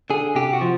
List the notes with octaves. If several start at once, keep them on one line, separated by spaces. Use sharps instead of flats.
D3 G#4
C3 G4
F#4
F3